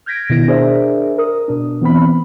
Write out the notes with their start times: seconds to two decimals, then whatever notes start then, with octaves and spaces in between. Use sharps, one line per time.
0.06 F6 G6 G#6 A#6 B6 D7
0.30 B2 D#3 B3 E4 A#6 D7
0.48 D4 G#4 A#4 C5 D5 E5
1.18 A#4 D#6
1.48 B2 D4
1.82 E3 B3 C4 B5